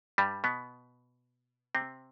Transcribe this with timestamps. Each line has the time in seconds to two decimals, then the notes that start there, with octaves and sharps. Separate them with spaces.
0.18 G2 G3
0.44 B2 B3
1.75 C3 C4